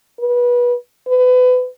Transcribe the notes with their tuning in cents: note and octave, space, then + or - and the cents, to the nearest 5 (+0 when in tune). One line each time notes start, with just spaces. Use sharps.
B4 -25
B4 +30